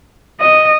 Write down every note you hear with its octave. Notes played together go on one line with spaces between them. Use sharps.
D#5